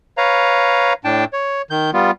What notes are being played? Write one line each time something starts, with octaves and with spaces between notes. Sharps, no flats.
B4 C#5 F5 A#5
A2 D4 G5 A5
C#5
D#3 G6
G3 B3 F4